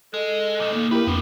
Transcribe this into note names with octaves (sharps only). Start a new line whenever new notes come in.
G#3 A4 D#5
A#2 D#3
A#3
E4 G4 A#4 B4
F2 F3 B3 D4 G4